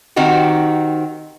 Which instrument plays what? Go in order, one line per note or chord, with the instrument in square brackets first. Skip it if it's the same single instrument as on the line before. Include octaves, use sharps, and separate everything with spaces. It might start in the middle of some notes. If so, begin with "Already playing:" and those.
[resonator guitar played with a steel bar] D#3 C4 D#4 F#4 G4